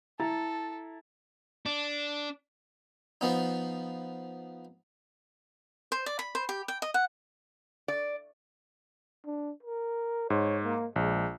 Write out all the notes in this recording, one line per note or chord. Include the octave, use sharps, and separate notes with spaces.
E4 A4 A#5 A6
D4
F3 B3 D#4
C5
D5
B5
C5
G4
G5
D#5
F#5
D5
D4
A#4
G#2 C#5
A#3
A#1 G#3